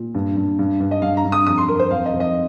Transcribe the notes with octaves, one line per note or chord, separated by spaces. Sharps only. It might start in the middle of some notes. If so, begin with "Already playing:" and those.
Already playing: A#2
G2
G2
G2
G2
D#5
G2 F5
A#5
G2
D#6
F2 D#6
C6
F2 A#4
C5
F2 F5
D#5
F2
D#5